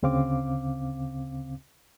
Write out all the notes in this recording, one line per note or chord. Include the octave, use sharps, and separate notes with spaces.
D2 C#3 C4 F5 D6